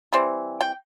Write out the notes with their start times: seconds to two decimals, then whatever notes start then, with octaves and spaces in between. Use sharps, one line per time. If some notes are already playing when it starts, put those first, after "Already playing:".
0.13 E3 G3 C4
0.61 G5